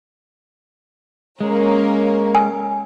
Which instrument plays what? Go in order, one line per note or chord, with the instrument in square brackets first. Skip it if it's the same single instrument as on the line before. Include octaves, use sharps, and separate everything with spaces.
[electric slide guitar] G#3 [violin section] A#3 C#4 A#4
[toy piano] G#5